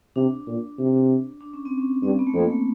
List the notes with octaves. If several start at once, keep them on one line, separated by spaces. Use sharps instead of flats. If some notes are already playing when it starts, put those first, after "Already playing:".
C3 D4
A#2
C3
D4
C#4
C4
C#4
G2 C4
B3
A3
F2 A#3
A3